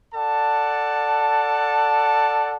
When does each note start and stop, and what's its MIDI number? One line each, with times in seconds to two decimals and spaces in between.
0.15 2.56 69
0.15 2.56 74
0.15 2.56 78
0.15 2.56 81